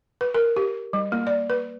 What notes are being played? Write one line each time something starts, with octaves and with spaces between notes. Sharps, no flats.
B4
A#4
G4
G3
A#3
D5
B4